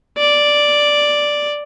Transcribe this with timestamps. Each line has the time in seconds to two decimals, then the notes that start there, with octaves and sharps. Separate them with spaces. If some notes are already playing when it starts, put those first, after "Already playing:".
0.18 D5